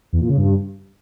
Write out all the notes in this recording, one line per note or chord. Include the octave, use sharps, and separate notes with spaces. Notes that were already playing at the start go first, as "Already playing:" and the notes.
E2
A#2
C#3
G2